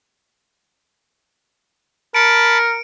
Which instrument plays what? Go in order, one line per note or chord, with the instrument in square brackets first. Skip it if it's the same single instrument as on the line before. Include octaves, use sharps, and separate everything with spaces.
[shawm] A#4 [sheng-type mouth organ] A5 B5 [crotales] C#7 D7